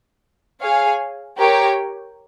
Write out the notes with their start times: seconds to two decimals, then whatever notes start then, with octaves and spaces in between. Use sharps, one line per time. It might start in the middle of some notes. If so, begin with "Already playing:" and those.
0.62 G#4 C#5 F5 G#5
1.38 G4 A#4 C#5 G5